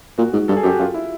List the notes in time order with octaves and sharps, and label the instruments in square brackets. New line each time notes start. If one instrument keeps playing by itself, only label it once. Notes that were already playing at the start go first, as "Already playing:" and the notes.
[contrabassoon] A#2 [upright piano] F#4
[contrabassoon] G#2
[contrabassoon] G2 [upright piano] A4
[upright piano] G#4
[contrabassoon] F#2 [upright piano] G4
[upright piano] F#4
[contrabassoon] F#2 [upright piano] F4
[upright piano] E4